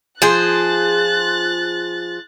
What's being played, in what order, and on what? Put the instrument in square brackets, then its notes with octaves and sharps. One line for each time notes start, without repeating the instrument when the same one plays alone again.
[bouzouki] F3 G#4 C5 [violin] F#6 A6